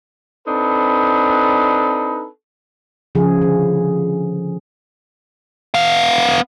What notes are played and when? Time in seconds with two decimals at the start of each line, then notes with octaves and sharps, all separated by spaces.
0.47 C4 D4 D#4 A4 B4
3.15 C#3 F3 G#4
3.42 D3
5.74 B3 F5